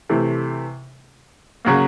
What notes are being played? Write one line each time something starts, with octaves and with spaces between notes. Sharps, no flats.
C3 E3 A3
C#3 F#3 A#3